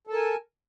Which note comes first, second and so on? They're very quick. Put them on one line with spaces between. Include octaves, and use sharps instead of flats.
A4 A5 A#4 G#5